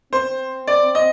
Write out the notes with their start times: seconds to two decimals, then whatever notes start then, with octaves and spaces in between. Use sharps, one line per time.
0.13 C4 C5
0.68 D5
0.95 D#5